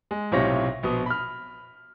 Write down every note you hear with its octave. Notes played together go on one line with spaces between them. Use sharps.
G#3
B1 A2 C3 F4 C#5 A#6
A#1 B2 D#6
B5 F6